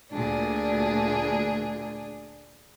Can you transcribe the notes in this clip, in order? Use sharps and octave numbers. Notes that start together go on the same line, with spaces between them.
D2 A#2 D4 G#4